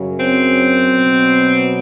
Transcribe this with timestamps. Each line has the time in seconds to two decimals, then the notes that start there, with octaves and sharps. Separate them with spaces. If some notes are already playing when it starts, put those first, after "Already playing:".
Already playing: F#2 C#3 F#3
0.18 C4
0.92 B2 F#3